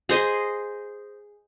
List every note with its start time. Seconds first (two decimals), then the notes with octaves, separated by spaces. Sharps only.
0.09 G#4 C5 D#5